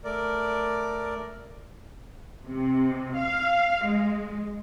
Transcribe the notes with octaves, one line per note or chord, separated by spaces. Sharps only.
A3 A#4 D5
C3
F5
G#3